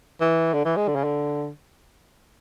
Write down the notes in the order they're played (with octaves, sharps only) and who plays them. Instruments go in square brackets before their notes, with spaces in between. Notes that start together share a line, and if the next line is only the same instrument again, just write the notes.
[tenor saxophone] E3
D3
E3
G#3
D3
C#3
D3